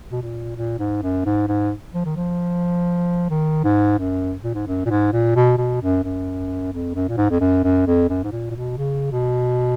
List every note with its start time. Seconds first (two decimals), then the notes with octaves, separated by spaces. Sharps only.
0.12 B2
0.22 A#2
0.56 A#2
0.79 G#2
1.02 F#2
1.26 G#2
1.48 G#2
1.94 F3
2.05 D#3
2.16 F3
3.30 D#3
3.64 G#2
3.99 F#2
4.44 A#2
4.54 G#2
4.67 F#2
4.86 A#2
4.90 G#2
5.13 A#2
5.36 B2
5.58 B2
5.82 F#2
6.04 F#2
6.73 F2
6.95 F#2
7.08 A#2
7.17 G#2
7.30 F2
7.40 F#2
7.64 F#2
7.87 F2
8.09 F#2
8.24 G#2
8.31 A#2
8.50 A#2
8.55 B2
8.77 C#3
9.11 B2